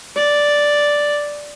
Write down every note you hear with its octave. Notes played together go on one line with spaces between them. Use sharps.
D5